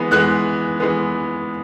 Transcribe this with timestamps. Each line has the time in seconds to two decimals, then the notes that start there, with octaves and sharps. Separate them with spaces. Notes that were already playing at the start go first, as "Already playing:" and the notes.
Already playing: E3 G#3 B3
0.11 E3 G#3 B3 F#6
0.80 E3 G#3 B3